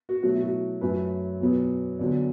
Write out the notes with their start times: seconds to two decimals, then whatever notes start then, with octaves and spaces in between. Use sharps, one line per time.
0.09 F#4
0.23 B2 F#3 A3 F#4
0.35 E4
0.42 F#4
0.81 F#2 F#3 A3 B4
1.40 E2 B2 F#3 B3
1.99 E2 D3 F#3 D5